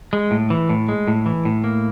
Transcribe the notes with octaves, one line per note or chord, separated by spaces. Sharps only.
G#3
A2
E3
A2
G#3
A2
E3
A2
A#3